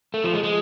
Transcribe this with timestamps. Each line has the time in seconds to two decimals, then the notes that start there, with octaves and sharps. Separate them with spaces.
0.14 A3
0.24 F3
0.33 G#3
0.43 G#3